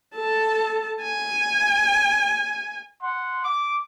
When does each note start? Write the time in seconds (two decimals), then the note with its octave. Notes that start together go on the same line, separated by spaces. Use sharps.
0.16 A4 A5
1.02 G#5
3.02 F#5 C6
3.44 D6